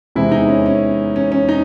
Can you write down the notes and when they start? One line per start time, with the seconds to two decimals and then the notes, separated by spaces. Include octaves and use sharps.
0.15 E2 C3 E3 G#3 E4
0.31 D#4
0.48 C#4
0.66 C#4
1.16 C#4
1.32 C#4
1.48 D#4